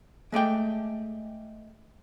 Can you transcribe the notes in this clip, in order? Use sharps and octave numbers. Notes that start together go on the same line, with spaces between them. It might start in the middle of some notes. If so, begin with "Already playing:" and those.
G#3 A3 D5 G5